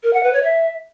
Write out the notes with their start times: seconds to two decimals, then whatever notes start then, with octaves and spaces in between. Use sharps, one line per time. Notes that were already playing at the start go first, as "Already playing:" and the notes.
0.03 A#4
0.13 F#5
0.23 B4
0.33 C#5
0.43 E5